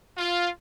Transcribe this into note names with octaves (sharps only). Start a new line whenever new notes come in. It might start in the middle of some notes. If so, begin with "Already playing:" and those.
F4